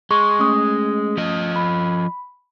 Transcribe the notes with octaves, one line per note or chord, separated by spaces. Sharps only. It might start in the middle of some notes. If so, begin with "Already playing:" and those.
G#3 C6 C#6
A3 C#4 D#6
F3 D#5
B5